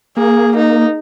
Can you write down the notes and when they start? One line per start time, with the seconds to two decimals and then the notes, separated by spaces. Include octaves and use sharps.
0.17 A#3 G#4
0.57 D#4